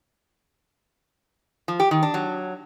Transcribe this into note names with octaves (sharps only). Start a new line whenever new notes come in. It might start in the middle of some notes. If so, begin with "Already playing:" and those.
F3
G4
D#3
D4
F#3